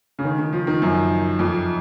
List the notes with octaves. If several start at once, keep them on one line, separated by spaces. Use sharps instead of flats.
C#3
D#3
D#3
F3
D#3
F#2
F2